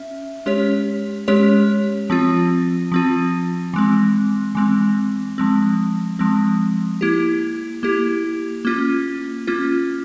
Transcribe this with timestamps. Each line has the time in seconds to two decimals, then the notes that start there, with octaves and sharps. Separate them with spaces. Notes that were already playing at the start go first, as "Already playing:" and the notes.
Already playing: C#4 E5
0.46 G#3 C#4 G4 C#5
1.28 G#3 C#4 G4 C#5
2.10 F3 C4 F4
2.92 F3 C4 F4
3.74 E3 G#3 C4
4.55 E3 G#3 C4
5.38 F3 G#3 C4
6.19 F3 G#3 C4
7.01 A#3 E4 G4
7.83 A#3 E4 G4
8.65 A#3 C#4 F4
9.47 A#3 C#4 F4